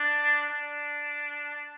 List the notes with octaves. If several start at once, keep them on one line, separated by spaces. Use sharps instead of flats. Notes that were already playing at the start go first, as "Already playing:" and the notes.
Already playing: D4
D4